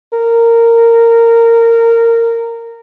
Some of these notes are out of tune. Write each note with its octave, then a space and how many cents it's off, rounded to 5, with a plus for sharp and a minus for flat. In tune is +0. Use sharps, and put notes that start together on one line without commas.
A#4 -15